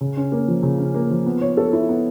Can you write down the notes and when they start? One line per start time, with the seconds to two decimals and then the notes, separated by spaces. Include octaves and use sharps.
0.01 C#3
0.17 C#4
0.32 A#3
0.48 F3
0.63 C#3
0.78 C#4
0.94 A#3
1.10 F3
1.26 B3
1.41 C#5
1.57 A4
1.73 E4
1.89 B3